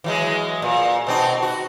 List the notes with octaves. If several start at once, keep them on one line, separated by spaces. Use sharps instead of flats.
E3 F#3 G#3
A#2
B2 C4 D#4
F#4